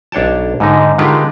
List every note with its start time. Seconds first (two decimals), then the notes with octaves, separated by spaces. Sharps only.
0.12 B1 D4 C#5 G5 A5
0.60 G#2 D3 D#4
0.98 D3 D#3 G#3 F4 G4 B4